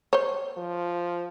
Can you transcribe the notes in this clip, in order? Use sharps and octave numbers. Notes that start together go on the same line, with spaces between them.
C5 C#5
F3